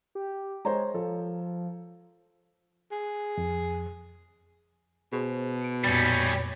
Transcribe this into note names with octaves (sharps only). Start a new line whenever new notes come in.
G4
G#3 C5 C#5 A#5
F3 A4
G#4
F2
B2 G#4 C5
C#7 D7
F2 A#2 G3 C#4 B5